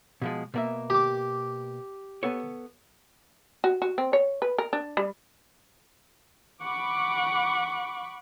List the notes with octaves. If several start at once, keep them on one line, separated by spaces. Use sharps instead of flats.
B2 F3 G#3
B2 A#3 E5
G4 D6
B3 A4 C#5
F#4
F#4
C4
C#5
B4
A#4
D4
G3
F#5 B5 C#6 D6